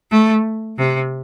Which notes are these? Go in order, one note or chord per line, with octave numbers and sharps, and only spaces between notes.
A3
C3